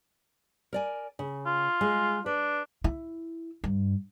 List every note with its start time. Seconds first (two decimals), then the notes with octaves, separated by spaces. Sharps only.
0.73 A#4 D5 G#5
1.19 C#3
1.46 F4
1.81 G#3
2.26 D4 B4
2.84 E4
3.64 G2